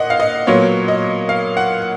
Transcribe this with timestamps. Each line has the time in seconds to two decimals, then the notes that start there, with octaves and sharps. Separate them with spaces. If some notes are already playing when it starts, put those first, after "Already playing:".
Already playing: A#2 D#5 F#5
0.10 F5
0.20 D#5
0.47 A#2 F#3 B3 C#5
0.88 D#5
1.29 F5
1.57 F#5